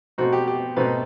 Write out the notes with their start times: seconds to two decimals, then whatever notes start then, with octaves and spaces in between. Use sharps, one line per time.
0.18 B2 A3 C4 D#4 F#4
0.33 G4
0.47 G4
0.76 B2 A3 C4 D#4 B4